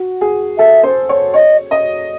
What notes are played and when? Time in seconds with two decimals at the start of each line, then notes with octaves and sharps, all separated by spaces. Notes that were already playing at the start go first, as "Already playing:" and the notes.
Already playing: F#4
0.21 G#4
0.58 A4 E5
0.83 C5
1.09 C#5
1.34 C#5 D#5
1.71 D#5